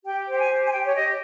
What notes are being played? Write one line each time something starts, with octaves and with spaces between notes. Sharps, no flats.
G4 G5
C5 G5
G#5
G4
G#5
G4 G5
C#5
G4 D#5